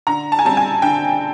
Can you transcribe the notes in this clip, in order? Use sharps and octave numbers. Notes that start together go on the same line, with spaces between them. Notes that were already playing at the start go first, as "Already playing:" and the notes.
D3 A#5
A5
G#5
G3 C4 A5
G#5
D3 G5